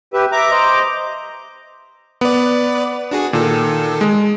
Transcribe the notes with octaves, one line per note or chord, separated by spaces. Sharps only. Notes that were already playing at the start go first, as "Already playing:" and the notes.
G4 B4 E5
E5 A#5 D6
C5 D#5
B3 B4 D5
D4 F#4 G#4
A#2 D#3 A4
G#3